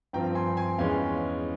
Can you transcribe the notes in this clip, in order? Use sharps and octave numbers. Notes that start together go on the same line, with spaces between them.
G2 F3 C4 F4 G5 A#5
G#5 C6
G#5 C6
E2 E3 G#3 C#4 F5 G#5